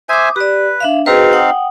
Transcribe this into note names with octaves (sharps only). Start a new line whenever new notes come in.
C5 E5 G#5 D6 D#6
G4 B4 D5
D4 E5 F5
C4 D#4 F#4 G#4 B4 F5
F#5 G5 D#6